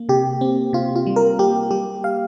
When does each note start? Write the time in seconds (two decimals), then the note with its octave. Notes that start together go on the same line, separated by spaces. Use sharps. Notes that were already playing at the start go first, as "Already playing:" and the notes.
Already playing: A#3
0.09 C3 G4
0.41 C4
0.73 C3 F4
0.96 F4
1.06 G3
1.16 A#4
1.39 A#3 G4
1.71 G3 G4
2.04 F5